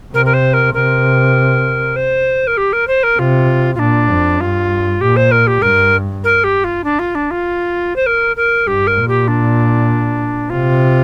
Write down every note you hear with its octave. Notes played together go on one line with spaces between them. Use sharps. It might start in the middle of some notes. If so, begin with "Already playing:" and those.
C3 A#4
A#4
C5
A#4
C3 A#4
C5
A#4
G4
A#4
C5
A#4
C3 F4
F4
A#2 D4
F2
G2 F4
A#2 G4
C5
A#4
G4
G2 A#4
A#4
G4
F4
D4
F4
D4
F4
C5
A#4
A#4
G2 G4
A#4
A#2
G4
D4
C3 F4